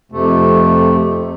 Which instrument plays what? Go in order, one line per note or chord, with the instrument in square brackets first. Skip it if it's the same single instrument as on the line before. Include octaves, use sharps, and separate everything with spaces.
[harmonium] F2 C3 A3